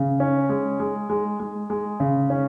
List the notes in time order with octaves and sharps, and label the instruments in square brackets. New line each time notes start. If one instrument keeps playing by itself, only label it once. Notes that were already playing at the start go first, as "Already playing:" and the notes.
Already playing: [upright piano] C#3
C#4
G#3
G#3
G#3
G#3
G#3
C#3
C#4